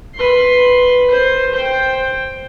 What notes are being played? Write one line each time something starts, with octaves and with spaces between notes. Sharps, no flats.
B4 C6
C5
C5 G5